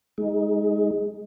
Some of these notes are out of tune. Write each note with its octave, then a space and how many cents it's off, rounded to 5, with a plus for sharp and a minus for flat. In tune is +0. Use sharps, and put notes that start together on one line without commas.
G#3 +0 D#4 +20